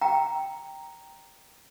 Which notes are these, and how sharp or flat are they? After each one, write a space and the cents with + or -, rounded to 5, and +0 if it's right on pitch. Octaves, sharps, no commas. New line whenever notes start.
G5 -5 A#5 +0